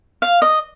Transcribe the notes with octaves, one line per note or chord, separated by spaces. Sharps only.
F5
D#5